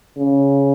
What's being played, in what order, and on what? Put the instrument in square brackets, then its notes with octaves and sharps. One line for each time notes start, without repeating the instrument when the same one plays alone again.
[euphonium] C#3